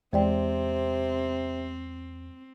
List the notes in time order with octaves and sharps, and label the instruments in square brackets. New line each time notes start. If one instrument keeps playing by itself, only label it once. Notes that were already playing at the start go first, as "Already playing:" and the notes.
[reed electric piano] E2 [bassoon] C3 [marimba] G#3 D5 G5 [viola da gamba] C4